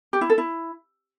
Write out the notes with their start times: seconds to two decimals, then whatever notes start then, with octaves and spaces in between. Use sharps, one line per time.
0.13 G4
0.21 E4
0.30 A4
0.38 E4